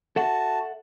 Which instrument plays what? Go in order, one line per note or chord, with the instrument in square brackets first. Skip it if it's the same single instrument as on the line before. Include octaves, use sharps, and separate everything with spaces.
[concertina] F#4 A5 [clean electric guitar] A4 E5 F#5